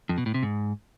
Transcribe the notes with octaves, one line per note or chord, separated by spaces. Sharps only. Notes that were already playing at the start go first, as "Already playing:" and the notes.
F2
B2
A2
C3
G#2